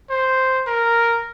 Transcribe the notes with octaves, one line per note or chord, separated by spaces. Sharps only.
C5
A#4